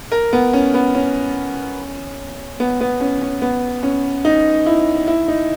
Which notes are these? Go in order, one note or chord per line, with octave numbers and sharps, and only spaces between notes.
A#4
B3
C#4
B3
C#4
B3
B3
C#4
C#4
B3
C#4
D#4
E4
E4
D#4